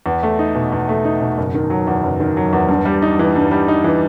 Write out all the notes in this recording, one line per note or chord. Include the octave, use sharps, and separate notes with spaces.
E2
A3
D#4
B2
E2
A3
D#4
B2
F#1
D#3
F#3
E2
F#1
D#3
F#3
E2
G2
G3
D#4
E3
G2
G3
D#4
E3